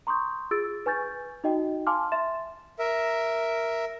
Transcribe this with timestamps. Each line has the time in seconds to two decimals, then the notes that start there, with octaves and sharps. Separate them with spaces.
0.07 A#5 C6 C#6 D#6 G6
0.51 F4 G#4 E6 A6 D7
0.86 B4 G#5 C#6 G6 A6
1.44 D#4 F#4 D#5 G5
1.87 F5 G#5 A5 C6 D6 F6
2.12 E5 C6 A6 E7
2.79 A#4 E5